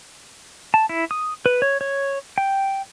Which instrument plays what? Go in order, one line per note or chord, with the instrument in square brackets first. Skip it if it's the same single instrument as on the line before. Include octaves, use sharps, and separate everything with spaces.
[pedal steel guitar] A5
E4
D#6
B4
C#5
C#5
G5